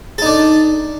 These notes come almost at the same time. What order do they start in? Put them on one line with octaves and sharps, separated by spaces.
A4 D#4 D4